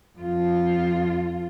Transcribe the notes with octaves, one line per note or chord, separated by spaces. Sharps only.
F2 F4